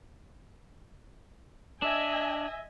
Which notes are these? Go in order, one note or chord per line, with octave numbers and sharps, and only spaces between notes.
D4 D#5 E5 G#5